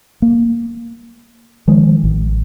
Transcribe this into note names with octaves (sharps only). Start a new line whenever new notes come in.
A#3
D#3 F3 G#3
A1